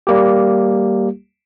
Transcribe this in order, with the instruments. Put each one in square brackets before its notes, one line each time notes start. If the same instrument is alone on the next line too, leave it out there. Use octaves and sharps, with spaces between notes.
[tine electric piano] G3 A#3 G4